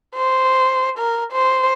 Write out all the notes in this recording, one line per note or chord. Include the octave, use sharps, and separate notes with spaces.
C5
A#4
C5